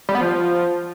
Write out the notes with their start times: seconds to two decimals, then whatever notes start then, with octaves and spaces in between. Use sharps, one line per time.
0.09 G3
0.15 B3
0.21 F3